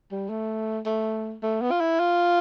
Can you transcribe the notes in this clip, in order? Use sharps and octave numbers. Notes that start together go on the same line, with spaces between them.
G3
A3
A3
A3
B3
F4
E4
F4